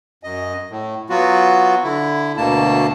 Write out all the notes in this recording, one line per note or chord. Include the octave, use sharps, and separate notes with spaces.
F#2 D#5
A2
F#3 B3 F4 F#4
D3 E4
D2 B2 A#3 A5